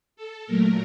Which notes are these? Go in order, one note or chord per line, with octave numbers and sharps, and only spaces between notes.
A4
A#2 F#3 A3 A#4